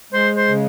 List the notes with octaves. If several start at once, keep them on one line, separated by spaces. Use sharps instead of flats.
G#3 C5
C5
C#3